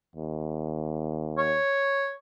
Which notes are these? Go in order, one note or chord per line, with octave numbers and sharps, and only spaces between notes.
D#2
C#5